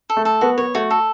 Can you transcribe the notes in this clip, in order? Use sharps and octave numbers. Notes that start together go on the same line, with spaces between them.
A4
A3
A4
B3 F#4
B3 C#5
A3 F#4
A4